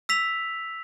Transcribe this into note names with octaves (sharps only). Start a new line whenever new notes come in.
E6 B6 F7